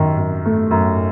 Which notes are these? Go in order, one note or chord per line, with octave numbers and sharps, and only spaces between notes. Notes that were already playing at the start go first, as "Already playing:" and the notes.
Already playing: F#2 D#3
F#2
A3
F#2